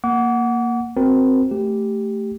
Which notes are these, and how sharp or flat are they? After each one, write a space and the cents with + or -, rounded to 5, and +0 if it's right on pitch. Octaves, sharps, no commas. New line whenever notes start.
A#3 +0 F#5 +0 D6 -35
C4 +0 F#4 +5 A#4 +10
A3 +0 G4 +0